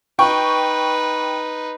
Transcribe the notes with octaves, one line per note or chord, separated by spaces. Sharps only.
D#4 B4 G5 C#6